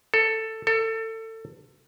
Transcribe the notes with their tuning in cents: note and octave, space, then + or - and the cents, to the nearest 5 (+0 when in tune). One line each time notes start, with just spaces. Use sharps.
A4 +10
A4 +25